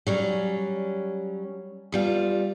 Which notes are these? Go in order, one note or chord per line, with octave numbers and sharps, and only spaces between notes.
F#3 G3 C#4
E2 G3 F4